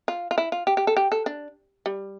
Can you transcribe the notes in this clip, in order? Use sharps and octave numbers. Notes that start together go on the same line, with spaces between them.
F4
F4
E4
F4
G4
G4
A4
G4
A4
D4
G3